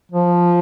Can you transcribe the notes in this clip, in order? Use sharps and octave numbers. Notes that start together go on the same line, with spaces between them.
F3